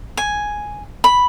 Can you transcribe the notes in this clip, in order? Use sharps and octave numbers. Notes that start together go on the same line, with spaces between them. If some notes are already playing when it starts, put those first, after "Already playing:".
G#5
B5